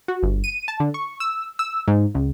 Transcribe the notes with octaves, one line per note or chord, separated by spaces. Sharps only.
F#4
G1
D#7
A5
D3
C#6
E6
E6
G#2
C#2